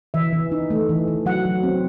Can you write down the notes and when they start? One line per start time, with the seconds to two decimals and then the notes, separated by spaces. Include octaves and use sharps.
0.14 E3 E5
0.33 E3
0.52 D#4
0.70 A3
0.89 E3
1.08 E3
1.26 F#3 F#5
1.45 F#3
1.63 C4